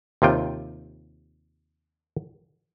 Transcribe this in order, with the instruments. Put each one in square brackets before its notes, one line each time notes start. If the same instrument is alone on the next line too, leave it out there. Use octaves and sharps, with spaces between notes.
[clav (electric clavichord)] D#2 C3 F4 G5